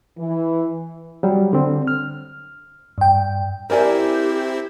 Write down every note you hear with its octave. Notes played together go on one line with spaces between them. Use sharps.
E3
F#3 G3
D3 C4
F6
G2 G5
C4 E4 G4 A#4 D5 G#5